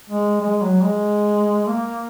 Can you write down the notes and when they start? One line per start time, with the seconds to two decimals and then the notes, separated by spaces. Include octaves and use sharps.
0.10 G#3
0.41 G#3
0.62 F#3
0.84 G#3
1.68 A#3